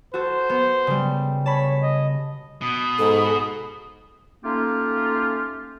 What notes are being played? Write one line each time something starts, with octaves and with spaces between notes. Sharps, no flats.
F#4 A4 C5
B3
C#3 G3
C#5 A5 B5
D#5
B2 D#6
G#2 A4
A3 A#3 C#4 D#4 F4 G4